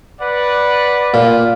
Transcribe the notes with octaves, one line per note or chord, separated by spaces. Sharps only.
B4 D5 F#5
A#2